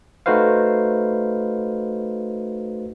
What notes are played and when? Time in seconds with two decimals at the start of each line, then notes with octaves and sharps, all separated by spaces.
0.26 A3 D#4 F#4 B4 C5 F5